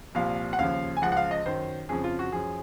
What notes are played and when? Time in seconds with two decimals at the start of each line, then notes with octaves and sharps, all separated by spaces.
0.15 C2 A#2 F3 F5
0.53 F#5
0.58 D#2 C#3 F3 F5
0.97 G#5
1.02 C#2 C#3 F3 F#5
1.12 F#5
1.17 F5
1.31 D#5
1.46 F#2 D#3 C5
1.89 F2 C#3 F3 G#4
2.04 F4
2.19 F#4
2.32 F#2 F3 G#4